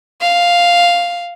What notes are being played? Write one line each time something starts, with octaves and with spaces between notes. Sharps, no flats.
F5